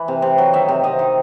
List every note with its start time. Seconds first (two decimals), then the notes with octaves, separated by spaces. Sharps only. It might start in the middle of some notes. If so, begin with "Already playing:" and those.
Already playing: E3
0.08 C3
0.22 C3
0.38 F#3
0.53 D#3 E5
0.69 C3
0.84 C3 D#5
0.99 D#3